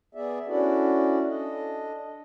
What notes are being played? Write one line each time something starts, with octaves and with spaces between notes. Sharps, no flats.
B3 G#4 D5 E5
C#4 D4 E4 F#4 A4 D5
D4 A4 D#5